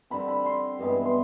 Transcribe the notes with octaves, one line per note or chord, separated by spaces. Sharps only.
D3 G3 C4 B5
B5
C6
G2 E3 G#3 B3
C6